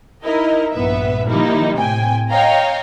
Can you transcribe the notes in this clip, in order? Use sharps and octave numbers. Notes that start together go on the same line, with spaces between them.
D#4 E4 A#4 D#5
A#1 G2 B3 B4 E5
D#3 F3 G3 A#3 D#4 E4
A2 C3 G5 G#5
C#5 D#5 F5 G5 A#5